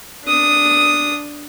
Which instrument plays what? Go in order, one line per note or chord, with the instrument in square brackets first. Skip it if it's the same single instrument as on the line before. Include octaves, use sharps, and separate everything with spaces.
[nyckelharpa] D4 D#6